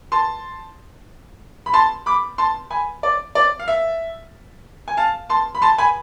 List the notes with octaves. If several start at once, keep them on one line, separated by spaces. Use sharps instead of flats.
A5 C6
B5
A5 C6
B5 D6
A5 C6
G#5 B5
D5
D5
F5
E5
G#5
F5 A5
A5 C6
B5
A5 C6
G#5 B5